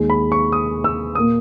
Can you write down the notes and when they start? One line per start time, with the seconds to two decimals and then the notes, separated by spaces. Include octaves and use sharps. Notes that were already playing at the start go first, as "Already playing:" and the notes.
Already playing: D#2 D#3 G#3
0.10 B5
0.32 C#6
0.52 D#6
0.84 E6
1.15 A#2 A#3 D#6